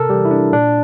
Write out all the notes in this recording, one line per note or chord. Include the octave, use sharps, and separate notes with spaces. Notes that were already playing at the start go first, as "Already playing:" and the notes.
Already playing: C3 A4 A#4
E3 G3 G4
E4
D4
A#2 D4